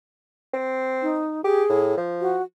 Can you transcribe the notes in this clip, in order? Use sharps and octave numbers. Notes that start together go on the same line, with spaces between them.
C4
D#4
G4 G#4
A2
F3
F#4